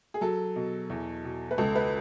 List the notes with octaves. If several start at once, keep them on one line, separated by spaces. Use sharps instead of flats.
G#4
F#3 A4
B2
E2
B2
B4
C#2 A4
B4